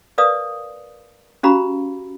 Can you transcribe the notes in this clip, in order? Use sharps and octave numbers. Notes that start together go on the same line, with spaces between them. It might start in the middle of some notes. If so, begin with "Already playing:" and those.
A#4 B4 D5 F5 D#6
C#4 F#4 G4 F5 A#5 B5